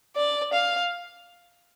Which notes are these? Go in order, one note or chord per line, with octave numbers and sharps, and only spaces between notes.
D5
F5